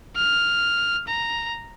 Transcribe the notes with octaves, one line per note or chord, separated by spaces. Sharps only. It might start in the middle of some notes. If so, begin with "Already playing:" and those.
F6
A#5